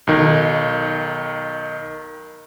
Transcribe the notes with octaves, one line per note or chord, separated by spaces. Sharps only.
B1 D#3